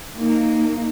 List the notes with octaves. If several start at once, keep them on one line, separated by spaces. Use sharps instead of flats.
A#3 D#4